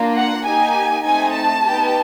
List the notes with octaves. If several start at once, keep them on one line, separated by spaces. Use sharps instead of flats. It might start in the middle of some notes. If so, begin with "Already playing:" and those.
Already playing: A#3 D4 F4
F#5
A#3 D#4 G4 G#5
A3 C4 D#4 G#5
A5
B3 D#4 G4